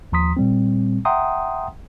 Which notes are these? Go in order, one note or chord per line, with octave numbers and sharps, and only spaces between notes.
D#2 F3 A#5 C6 D#6 B6
A#2 G3 C4
E5 F#5 G5 A#5 C6 D#6